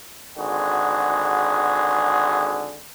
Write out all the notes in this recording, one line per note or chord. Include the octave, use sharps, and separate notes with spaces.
G#1 D3 F#4 G#4